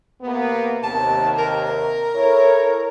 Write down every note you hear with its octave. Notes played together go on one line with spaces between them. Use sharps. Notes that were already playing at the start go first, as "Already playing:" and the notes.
C3 A#3 B3
D#2 C3 A5
A#4
E4 A4 C#5